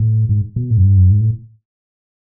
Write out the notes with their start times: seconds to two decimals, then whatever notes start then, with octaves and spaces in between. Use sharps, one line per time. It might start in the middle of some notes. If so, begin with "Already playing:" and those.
Already playing: A2
0.29 G#2
0.56 B2
0.70 A2
0.77 F#2
0.84 G2
0.97 F#2
1.11 G#2
1.21 A2